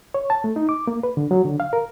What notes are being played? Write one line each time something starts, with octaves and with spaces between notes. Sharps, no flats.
C#5
A5
A3
D#4
D6
A#3
B4
D3
F#3
D3
F5
A#4